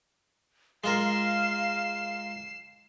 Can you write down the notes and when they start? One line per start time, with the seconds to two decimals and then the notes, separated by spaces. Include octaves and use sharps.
0.84 G#3 F4 A#4 F5 C7 E7